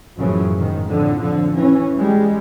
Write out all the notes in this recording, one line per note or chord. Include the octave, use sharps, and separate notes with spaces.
F#2 A2 C#3 E3 F3
G#2 D#3
F2 A2 D3
D3 F3
E3 C#4
G3 G#3